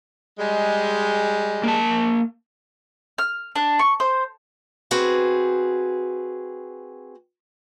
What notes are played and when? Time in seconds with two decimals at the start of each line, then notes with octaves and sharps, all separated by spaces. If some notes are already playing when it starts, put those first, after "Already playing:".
0.38 G3 G#3
1.63 A#3 A5
3.18 F6
3.55 D4
3.79 C#6
4.00 C5
4.91 C4 F#4 G#4 B4